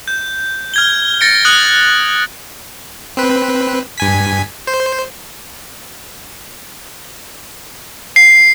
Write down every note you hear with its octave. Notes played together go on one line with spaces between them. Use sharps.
G6
F6 G#6 G7
A6 A#6 C#7 D7
D#6 F#6 C#7 F#7
C4 B4
G2 G#5 B6
C5
C7